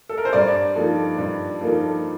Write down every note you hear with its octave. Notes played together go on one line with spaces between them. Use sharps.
A4
A#4
C5
G2 D5
F3 A#3 D#4 A4
G2
F3 A#3 D#4 A4